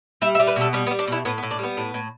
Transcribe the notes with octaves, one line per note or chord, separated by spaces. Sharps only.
G3 E5
E5
G3
B4
B2 A4
G3 B3
B3
G3
D4
B2 E4
A2 B3
B3
A2
D4
G3 B3
A2
A2